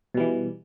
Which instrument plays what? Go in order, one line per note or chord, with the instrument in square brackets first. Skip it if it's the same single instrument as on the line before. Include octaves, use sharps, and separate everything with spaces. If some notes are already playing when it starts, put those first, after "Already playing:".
[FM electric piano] B2
G3
E3